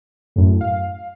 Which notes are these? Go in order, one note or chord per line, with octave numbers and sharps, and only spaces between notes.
F#2 A2
F5